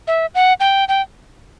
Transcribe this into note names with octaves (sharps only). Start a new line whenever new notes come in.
E5
F#5
G5
G5